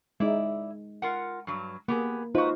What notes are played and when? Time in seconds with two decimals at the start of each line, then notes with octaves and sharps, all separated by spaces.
0.20 G#3 D#4 E4 D5
1.02 F4 A#4 F#5
1.47 G2 F#3
1.88 A#3 B3 G4 G#4
2.35 D#4 F4 F#4 B4 C5